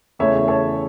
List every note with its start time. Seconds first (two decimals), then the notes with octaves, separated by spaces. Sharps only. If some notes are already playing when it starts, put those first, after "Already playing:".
0.19 E2 C#3 E3 A3 C#5 E5
0.48 A4 C#5